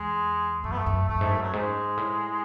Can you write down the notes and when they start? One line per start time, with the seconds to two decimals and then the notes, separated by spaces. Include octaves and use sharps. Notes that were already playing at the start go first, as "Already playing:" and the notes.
Already playing: E2 G#3
0.64 F#2 A3
0.72 B3
0.78 A3
0.86 F#2
1.09 F#2 A3
1.21 G#2
1.31 F#2
1.42 F#3
1.53 G#2 G#3
1.97 A2